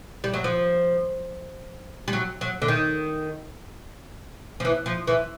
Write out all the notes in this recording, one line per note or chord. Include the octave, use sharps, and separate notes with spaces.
G3
F#3
F3
G3
F#3
F#3
D3
D#3
F3
E3
F3
E3